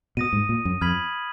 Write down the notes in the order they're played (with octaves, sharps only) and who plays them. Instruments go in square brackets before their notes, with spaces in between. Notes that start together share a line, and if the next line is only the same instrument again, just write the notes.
[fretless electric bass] B2 [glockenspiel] D#6 A#6 D#7
[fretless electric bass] G#2
A#2
F#2
[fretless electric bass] F2 [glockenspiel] B5 F6 G#6 B6 F#7